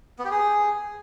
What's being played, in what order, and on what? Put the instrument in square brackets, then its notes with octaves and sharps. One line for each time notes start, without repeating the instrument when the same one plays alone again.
[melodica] B3
G4
G#4